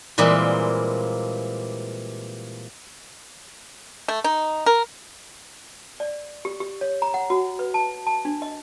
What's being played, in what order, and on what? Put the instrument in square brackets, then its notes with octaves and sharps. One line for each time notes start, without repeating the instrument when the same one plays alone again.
[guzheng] A#2 E3 G3 G#3 A#3 C4
[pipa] A3
D#4
A#4
[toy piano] D5
G4
G4
C#5
A#5
F#5
F#4
B4
A5
A5
D4
D#5